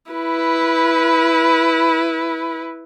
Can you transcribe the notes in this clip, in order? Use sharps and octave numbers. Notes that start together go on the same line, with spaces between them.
E4 B4